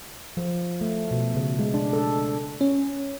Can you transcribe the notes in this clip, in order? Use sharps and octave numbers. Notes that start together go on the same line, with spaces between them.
F3
A3
B2
C#3
G#3
D4
A4
C#4